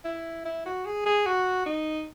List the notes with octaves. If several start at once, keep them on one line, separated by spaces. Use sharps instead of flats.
E4
E4
F#4
G#4
G#4
F#4
D#4